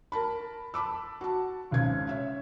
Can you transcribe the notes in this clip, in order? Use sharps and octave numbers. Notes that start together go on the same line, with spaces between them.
A#4 A5 B5
A5 B5 D6 E6
F#4 A5
G#1 C#2 C#3 G#6
C#5 E5